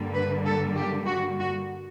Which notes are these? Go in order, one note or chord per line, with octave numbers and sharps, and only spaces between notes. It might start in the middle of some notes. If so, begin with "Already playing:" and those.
Already playing: G2 D3 G3 A#3
B4
A4
G4
F#4
F#4